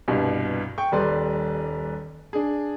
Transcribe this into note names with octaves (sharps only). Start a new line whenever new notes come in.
C2 G2 B2
G5 C#6
D#1 G3 B4 D5 C6
D4 G#4